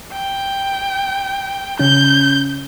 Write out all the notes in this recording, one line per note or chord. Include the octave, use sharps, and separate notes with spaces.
G5
C#3 C#4 G6